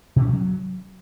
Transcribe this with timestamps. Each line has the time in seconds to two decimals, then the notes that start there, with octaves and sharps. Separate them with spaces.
0.16 B2
0.22 C#4
0.28 F3
0.33 F#3